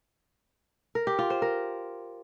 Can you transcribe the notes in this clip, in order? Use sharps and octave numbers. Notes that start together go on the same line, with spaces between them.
A#4
G4
F4
C5
A#4